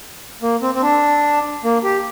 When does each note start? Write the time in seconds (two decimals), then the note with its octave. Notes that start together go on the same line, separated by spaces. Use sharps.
0.42 A#3
0.62 C4
0.75 C4
0.82 D4
1.64 A#3
1.83 G4